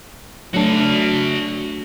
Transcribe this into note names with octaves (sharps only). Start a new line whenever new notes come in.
F#3 A3 D4 F#4 A5